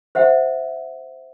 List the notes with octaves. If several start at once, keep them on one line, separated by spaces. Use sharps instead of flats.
C5 E5 F#5